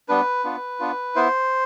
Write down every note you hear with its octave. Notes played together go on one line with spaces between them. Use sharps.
G3 B3 D4 B4
B3 D4 F4
B3 D4 F4
B3 E4 C5